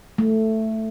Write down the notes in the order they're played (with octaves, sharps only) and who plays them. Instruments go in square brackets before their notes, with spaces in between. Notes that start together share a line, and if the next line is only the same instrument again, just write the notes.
[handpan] A3